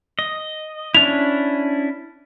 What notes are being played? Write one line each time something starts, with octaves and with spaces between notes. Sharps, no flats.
D#5
C#4 D4 E4 F7